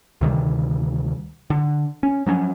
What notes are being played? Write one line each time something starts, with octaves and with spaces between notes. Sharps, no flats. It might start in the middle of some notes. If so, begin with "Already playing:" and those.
D2 C3 D#3 G3
D3
C#4
F3 F#3 B3 C#4